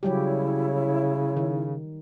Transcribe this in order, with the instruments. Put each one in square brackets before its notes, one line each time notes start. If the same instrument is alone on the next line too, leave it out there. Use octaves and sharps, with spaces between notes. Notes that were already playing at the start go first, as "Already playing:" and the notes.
[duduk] C#3 [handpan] F#3 G3 G4 [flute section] E4 C#5
[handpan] D#3